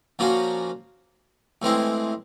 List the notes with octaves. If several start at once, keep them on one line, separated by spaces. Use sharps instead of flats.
A#2 F3 A#3 C#4 F#4
A2 E3 G#3 C4 E4